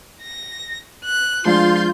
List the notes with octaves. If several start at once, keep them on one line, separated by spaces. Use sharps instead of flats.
A#6
F#6
F3 G#3 D4 F4 F5 C6 G6